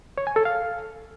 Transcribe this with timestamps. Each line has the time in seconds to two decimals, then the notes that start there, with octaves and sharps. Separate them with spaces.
0.18 C#5
0.27 G#5
0.36 A4
0.45 F5